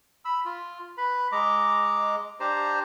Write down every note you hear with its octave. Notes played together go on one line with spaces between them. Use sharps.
B5 E6
F4
B4 B5
G#3 D#5 A#5 D6
D4 G4 C5 A#5